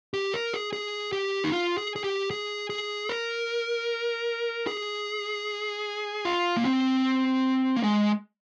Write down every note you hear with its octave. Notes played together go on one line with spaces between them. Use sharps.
G4
A#4
G#4
G#4
G4
D#4
F4
G#4
G#4
G4
G#4
G#4
A#4
G#4
F4
A#3
C4
A#3
G#3